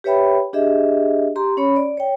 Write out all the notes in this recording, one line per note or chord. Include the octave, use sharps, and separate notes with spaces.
G4 B4 C#5 E5 G5 B5
D4 G4 G#4 D#5 E5
G4 A#5 C6
C#4 C#5 B5
D5
C#5 G5